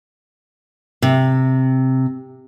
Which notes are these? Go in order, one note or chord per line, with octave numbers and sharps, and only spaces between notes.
C3